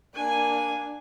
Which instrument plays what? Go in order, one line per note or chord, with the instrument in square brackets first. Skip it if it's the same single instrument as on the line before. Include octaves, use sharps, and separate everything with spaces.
[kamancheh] A#3 D4 [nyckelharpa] G#5